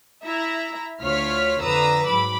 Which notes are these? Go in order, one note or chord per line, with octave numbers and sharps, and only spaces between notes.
E4 E5 A#5
D2 F4 C#5 F6 B6
F2 D3 B4 A#5 D#6 E6
G#2 F#3 B5 D6